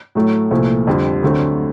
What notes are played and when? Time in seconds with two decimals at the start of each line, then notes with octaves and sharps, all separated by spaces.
0.15 A2 F#3 A3
0.51 C2 A#2 F3 A3
0.87 F2 D3 G3
1.23 D2 D3 F#3 A3 C4